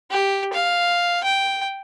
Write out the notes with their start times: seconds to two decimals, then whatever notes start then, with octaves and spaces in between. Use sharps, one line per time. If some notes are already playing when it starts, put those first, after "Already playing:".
0.10 G4
0.53 F5
1.24 G5